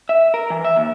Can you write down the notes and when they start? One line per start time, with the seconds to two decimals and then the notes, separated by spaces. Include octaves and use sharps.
0.09 E5
0.34 A#4
0.50 E3
0.64 E5
0.76 D#2